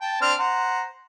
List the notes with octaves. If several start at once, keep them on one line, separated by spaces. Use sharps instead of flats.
G5 A5
C4 D4 F6
C5 F#5 A#5